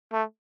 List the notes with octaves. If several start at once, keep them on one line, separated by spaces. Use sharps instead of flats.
A3